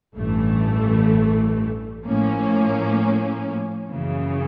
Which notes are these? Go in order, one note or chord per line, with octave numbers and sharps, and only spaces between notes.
A1 G2 E3 A3
A2 F3 A#3 C#4
F#2 C#3 E3